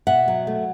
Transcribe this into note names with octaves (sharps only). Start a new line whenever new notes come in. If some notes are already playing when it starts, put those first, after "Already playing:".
B2 E5 F#5
F#3
A3